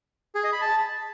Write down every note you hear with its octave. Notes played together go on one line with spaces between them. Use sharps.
G#4
D#5
B5
A5